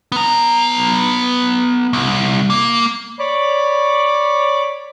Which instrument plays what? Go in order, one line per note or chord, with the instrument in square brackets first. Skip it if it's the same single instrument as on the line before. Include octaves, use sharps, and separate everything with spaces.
[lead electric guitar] B3 A#5
C2
A#3
[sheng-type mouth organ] C#5 D5 B5 D6